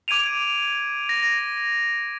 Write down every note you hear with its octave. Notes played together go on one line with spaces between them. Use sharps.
D6 G#6 D7 D#7 F7
A#6